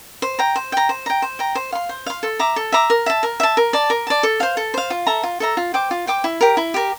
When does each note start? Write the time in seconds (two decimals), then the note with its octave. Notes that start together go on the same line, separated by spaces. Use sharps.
0.22 C5
0.39 G5 A#5
0.56 C5
0.72 G5 A#5
0.89 C5
1.06 G5 A#5
1.22 C5
1.39 G5 A#5
1.55 C5
1.72 F5 C6
1.89 C5
2.06 F5 C6
2.23 A4
2.39 E5 A#5 D6
2.56 A4
2.72 E5 A#5 D6
2.90 A#4
3.06 E5 A5
3.23 A#4
3.40 E5 A5
3.57 A#4
3.73 D5 A5
3.90 A#4
4.07 D5 A5
4.23 A4
4.40 C5 F5
4.57 A4
4.74 C5 F5
4.90 F4
5.07 A4 E5 A#5
5.23 F4
5.40 A4 E5 A#5
5.57 F4
5.74 C5 G5 D6
5.91 F4
6.07 C5 G5 D6
6.24 E4
6.41 G4 A#4
6.57 E4
6.74 G4 A#4